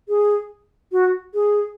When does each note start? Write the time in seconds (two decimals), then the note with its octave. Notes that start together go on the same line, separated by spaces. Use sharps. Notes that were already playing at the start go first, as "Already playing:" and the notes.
0.09 G#4
0.92 F#4
1.34 G#4